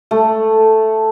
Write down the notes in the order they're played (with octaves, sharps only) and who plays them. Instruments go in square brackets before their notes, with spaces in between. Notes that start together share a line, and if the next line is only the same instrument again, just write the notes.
[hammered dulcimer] A3